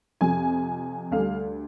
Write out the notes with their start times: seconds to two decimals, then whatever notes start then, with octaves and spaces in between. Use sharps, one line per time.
0.21 F2 C3 F3 G#5
1.11 D2 D3 G3 F5